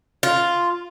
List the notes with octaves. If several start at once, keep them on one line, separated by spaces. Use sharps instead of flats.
F4